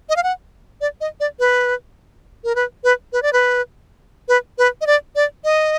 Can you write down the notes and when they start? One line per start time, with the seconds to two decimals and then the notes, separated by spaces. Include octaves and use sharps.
0.09 D#5
0.16 F5
0.23 F#5
0.81 D5
1.01 D#5
1.20 D5
1.39 B4
2.44 A#4
2.56 B4
2.84 B4
3.13 B4
3.22 D5
3.33 B4
4.28 B4
4.58 B4
4.81 D#5
4.87 D5
5.16 D5
5.44 D#5